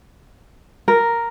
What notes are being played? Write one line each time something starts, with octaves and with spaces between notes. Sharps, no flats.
A#4